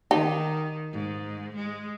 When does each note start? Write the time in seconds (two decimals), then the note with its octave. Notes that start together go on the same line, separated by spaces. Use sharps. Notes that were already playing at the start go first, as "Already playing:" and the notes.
0.11 D#3 D#4 G4
0.92 G#2
1.56 G#3